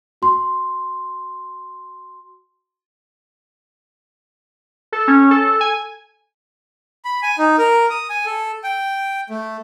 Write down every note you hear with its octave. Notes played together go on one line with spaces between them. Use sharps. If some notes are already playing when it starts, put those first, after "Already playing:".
F#4 C6
A4
C#4
A4
G#5
B5
G#5
D#4
A#4
D#6
G#5
A4
G5
A3